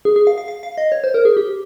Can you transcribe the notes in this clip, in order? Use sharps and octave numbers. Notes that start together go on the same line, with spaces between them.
G#4
G#4
F5
F5
F5
F5
D#5
C#5
C5
A#4
G#4
G4